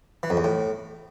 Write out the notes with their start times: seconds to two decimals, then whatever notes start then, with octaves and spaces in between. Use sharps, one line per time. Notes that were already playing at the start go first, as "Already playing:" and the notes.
0.23 E3
0.30 F2
0.37 E2
0.44 A2